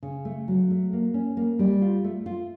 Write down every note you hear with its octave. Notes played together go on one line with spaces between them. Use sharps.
C#3
A3
F#3
A3
A#3
C#4
A#3
G3
F4
A3
F4